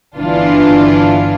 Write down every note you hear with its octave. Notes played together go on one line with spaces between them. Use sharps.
G1 E3 D4 F4